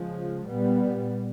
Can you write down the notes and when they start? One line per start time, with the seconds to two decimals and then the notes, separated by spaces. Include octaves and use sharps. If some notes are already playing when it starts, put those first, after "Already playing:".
Already playing: C#3 F3 G#3
0.46 A#2 G3 B3